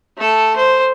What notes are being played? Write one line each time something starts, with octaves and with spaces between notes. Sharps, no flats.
A3 A4
C5